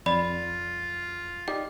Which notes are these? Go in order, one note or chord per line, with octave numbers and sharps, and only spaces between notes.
F2 F4 D5 B5
D#4 G4 D5 G5